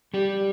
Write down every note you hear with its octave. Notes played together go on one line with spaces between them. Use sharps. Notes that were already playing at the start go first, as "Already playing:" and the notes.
G3 G4